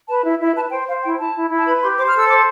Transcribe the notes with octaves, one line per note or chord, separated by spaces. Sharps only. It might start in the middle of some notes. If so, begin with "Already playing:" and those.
B4 A5
E4
E4 E5
B4 A5
C5 G5
C5 F5
E4 G5
E4 A5
E4
E4
A5
B4 B5
G4 C6
C5 D6
F6
A4
E6
C5 D6